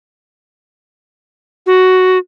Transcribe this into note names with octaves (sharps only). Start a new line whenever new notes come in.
F#4